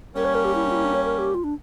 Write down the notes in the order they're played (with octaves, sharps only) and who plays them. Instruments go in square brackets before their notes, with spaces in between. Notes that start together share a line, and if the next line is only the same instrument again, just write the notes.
[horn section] G3 A#3 C#4 [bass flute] A#4
[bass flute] C#5
A#4
G4
E4
D4
F4
E4
D4
C#5
A#4
G4
F4
D4